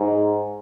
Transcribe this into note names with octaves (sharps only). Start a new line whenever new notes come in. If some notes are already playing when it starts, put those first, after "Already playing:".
Already playing: G#2